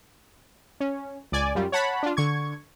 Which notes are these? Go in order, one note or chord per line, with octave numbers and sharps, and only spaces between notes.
C#4
C#2 D5 G#5
F#2 G3 F4
C#5 F#5 A5 B5
D4 F4
D3 C#6 G#6